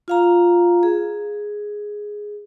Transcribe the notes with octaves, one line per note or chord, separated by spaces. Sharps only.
F4 F5 A#5
G#4